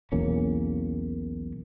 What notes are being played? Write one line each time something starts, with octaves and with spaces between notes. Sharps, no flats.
B1 E2 A#3 C#4